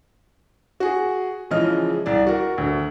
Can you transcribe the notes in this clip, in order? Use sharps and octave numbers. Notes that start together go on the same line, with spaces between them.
F#4 G#4
C#3 E3 F3 G#3 D#5 F6
C2 D5
F#4 A#4
D2